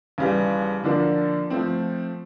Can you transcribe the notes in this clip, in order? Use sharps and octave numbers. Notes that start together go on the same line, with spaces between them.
D#2 C#3 E3 G3
D3 F3 A#3 D4
F3 A3 C4